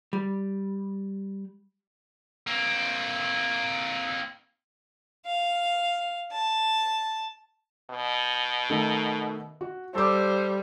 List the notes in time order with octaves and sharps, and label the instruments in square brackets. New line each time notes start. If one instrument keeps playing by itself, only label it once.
[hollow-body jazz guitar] G3
[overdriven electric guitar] A#3 C4
[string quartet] F5
A5
[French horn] B2
[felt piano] D#3 A3
F#4
[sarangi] G3 [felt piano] A4 D6 [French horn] C5